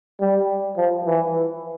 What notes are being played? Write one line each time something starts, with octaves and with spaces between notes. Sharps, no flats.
G3
F3
E3